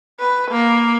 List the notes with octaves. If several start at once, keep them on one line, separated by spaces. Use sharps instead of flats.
B4
A#3